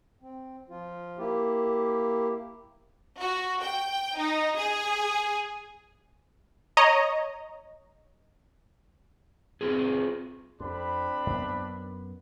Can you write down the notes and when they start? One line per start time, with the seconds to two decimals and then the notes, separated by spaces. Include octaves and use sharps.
0.22 C4
0.69 F3 F4
1.18 A#3 E4 G4
3.20 F#4
3.62 G5
4.17 D#4
4.56 G#4
6.77 C#5 D#5 A#5
9.61 C4 F4 G#4
10.60 F2 C4 D4 B5
11.27 F#2 B3